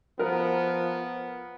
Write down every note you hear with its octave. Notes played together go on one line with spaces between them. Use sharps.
F3 B3 A#4